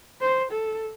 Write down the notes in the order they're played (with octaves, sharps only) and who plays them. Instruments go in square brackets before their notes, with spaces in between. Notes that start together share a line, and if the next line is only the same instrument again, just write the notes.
[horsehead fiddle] C5
A4